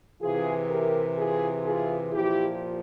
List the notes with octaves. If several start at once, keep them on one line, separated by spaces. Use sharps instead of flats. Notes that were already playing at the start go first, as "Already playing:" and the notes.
C3 E3 F4 G#4
G4 A#4
F4 G#4
F4 G#4
A#2 F3 E4 G4